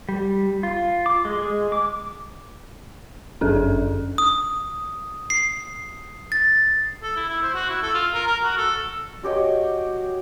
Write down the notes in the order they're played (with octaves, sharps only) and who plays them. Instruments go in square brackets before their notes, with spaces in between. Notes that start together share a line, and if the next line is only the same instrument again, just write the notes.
[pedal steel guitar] G3
F4
D6
G#3
G#3
D6
[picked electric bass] G1 F#2 D4 [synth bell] C#4 G#4 A4
[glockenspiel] D#6
C7
A6
[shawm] A4
E4
E4
C5
F#4
E4
A4
F4
A#4
A#4
F#4
A4
[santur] F#4 G4 C#5 D#5